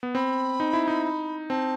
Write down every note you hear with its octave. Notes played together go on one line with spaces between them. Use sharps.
B3
C4 B5
D#4
E4
D#4
C4 A5